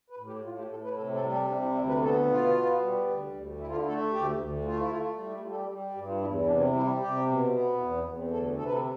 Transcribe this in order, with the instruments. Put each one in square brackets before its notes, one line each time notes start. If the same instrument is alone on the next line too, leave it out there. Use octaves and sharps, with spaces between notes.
[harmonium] B4
A2
G4
A2 F4
G4
A2 A4
B4
C3 A4
A4
G3
A4
C3 D4
E4
D2 E4
B4
B3 A4
B2 F4
B3
G3
D2
D2
D3 E4
F4
E4
A3 A4
D2 G4
D2
A3 F4
E4
A3 F4
G3
E4
G3 F4
A4
G4
G3 G4
G2 G4
F4
E2 E4
E4
C3 D4
C4
G3 E4
C3 G4
B2
B3
E2 E4
C4
E2 B3
C4
D2 A4
C3 A4
B4
A4